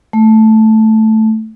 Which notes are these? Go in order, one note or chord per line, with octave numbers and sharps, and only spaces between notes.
A3